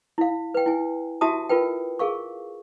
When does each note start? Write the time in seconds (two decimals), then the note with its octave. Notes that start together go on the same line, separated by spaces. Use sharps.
0.18 E4 F5
0.54 B4 G5
0.66 E4 G#5
1.21 E4 F#4 G4 E5 A5 D#6
1.49 F4 A#4 B4 G5
1.99 G#4 A#4 F5 C#6